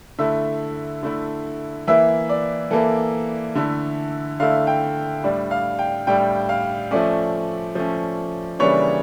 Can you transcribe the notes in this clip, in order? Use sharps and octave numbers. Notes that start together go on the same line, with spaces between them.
D3 A3 E4 E5
D3 A3 E4
E3 A#3 E4 E5
D5
E3 A#3 E4 A4
D3 A3 E4
D3 A3 E4 F5
G5
A2 G3 D4
F5
G5
A2 G3 D4 G5
F5
F3 A3 C#4 D5
F3 A3 C#4
C#3 E3 G3 A#3 D4 C#5